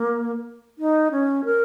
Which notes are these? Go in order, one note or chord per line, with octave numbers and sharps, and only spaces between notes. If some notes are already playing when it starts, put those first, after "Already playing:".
Already playing: A#3
D#4
C#4
A#4